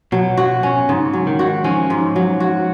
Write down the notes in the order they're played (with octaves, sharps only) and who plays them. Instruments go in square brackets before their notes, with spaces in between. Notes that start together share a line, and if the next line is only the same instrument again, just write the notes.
[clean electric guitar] B2 [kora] F#3
[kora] F#4
C#4
[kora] G#2 [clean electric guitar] C#3
[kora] F#3
[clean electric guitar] D#3
[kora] F#4
[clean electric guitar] F3 [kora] C#4
[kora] G#2
F#3
F#4